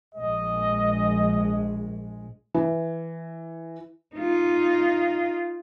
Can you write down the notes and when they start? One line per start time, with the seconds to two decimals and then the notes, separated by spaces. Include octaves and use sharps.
0.15 A#1 G#3 D#5
2.54 E3
4.16 D#4 F4